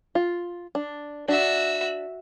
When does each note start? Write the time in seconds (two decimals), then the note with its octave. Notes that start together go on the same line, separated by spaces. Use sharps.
0.15 F4
0.75 D4
1.28 D4 F#4 E5